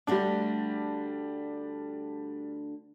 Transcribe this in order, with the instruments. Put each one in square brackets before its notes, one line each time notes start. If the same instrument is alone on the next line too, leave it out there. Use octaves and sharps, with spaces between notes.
[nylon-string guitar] D2 D3 A3 [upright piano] G3 D4